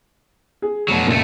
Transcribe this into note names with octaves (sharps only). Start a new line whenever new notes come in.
G#4
F1 B2 F#3
C#2 A#2 A3